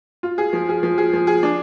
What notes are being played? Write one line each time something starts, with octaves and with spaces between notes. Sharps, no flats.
F4
G#4
F3
G#4
F3
G#4
F3
G#4
D4